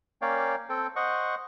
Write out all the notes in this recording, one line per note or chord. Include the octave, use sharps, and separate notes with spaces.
A#3 C#4 C#5 D5 F5 G5
C4 A4 G5
C5 D#5 F#5 C#6